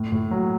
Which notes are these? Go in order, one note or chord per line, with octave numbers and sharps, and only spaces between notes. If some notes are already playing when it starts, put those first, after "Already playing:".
Already playing: A2
A2
F#3